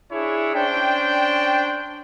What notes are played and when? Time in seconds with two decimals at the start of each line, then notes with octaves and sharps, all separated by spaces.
0.11 D4 E4 G#4 C#5 E5
0.55 C#4 D4 C5 G5